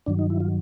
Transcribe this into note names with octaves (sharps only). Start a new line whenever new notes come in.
G2 D#3 F#3 D4
D#4
E4
F4